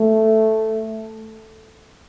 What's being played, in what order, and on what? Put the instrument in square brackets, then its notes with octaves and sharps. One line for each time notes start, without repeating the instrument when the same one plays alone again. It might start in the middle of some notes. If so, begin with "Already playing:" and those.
Already playing: [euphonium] A3